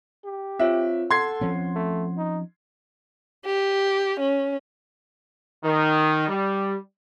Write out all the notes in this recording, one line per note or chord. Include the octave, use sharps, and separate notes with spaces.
G4
C4 F4 C#5 E5
A4 F#5 C6 G#6 C7
F3 C4 C#4
A3
D#4
G4
C#4
D#3
G3